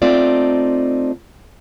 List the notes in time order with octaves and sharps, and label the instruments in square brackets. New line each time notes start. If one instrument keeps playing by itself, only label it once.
[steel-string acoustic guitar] A3 C4 D#4 F4 D5